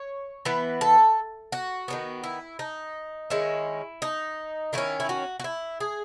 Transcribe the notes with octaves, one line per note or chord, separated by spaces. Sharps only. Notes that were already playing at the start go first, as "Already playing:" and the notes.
Already playing: C#5
E3 B3 B4
A4
F#4
D#3 F#3 B3
E4
D#4
D#3 G#3 C#4 E4
D#4
D#3 A3 C#4 E4
E4
F#4
F#4
E4
G#4